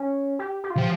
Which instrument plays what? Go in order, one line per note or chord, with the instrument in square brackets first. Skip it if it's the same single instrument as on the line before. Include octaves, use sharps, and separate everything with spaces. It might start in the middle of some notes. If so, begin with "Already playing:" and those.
Already playing: [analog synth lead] C#4
G4
G4
F4
[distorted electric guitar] F3 [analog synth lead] G4